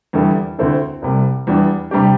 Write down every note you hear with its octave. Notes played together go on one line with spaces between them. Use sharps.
E2 D3 G3 E4 A4
D2 D3 C4 E4 A4
C2 C3 G3
E2 E3 G3 D4
C3 G3 D4 G4